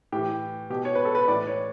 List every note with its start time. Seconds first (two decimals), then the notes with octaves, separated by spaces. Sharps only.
0.12 A2 E3 G4
0.70 B2 G4
0.85 C#5
0.95 B4
1.05 A4
1.15 B4
1.28 A2 E3 D5
1.47 C#5